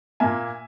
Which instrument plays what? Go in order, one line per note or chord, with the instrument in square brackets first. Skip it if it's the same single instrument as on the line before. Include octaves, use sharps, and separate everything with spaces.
[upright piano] A#2 A#3 E5 G#5